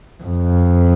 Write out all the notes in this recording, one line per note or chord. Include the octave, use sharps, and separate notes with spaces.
F2